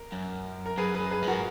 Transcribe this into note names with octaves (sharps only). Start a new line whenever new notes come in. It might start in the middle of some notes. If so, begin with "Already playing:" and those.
Already playing: A#4
F#2
A#4
F#2 G#4 B4
G#4 B4
F#2
G#4 B4
G#2
F#4 A#4